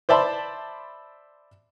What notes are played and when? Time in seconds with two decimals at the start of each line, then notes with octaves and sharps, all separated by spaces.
0.09 C5 D5 E5 A5 B5 C6